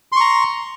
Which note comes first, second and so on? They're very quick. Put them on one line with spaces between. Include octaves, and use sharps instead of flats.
C6 C#6 A#5